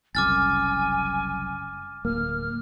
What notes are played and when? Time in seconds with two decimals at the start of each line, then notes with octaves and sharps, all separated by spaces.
0.15 F#1 C2 F#2 G#5 D6 F6 A6
2.05 D1 A#3 F6